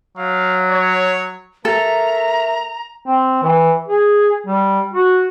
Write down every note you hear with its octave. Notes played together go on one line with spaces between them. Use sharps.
F#3 F5
C#5
A3 A4 A#4 E5 A#5
C4
E3
G#4
G3
F#4